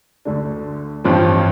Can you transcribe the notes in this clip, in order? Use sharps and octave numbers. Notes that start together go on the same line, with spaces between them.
D2 D3 A3 D4
A1 G2 F3 C4 F4